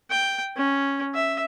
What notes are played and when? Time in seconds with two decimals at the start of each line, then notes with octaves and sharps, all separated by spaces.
0.11 G5
0.57 C#4
1.15 E5